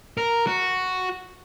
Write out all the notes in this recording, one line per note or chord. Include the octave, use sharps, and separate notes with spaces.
A#4
F#4